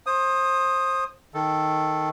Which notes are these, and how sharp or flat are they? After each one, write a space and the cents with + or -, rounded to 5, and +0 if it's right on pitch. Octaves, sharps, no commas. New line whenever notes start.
C5 +25 D#6 +0
D#3 +5 A4 +0